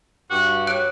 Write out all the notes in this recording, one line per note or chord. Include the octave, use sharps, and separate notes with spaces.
G2 F#4 G4
F#3 F#6 D7